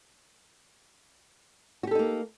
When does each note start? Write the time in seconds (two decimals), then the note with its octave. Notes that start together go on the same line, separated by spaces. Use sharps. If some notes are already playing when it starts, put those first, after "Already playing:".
1.83 F#4
1.87 G4
1.91 A4
1.95 D#4
1.99 A#3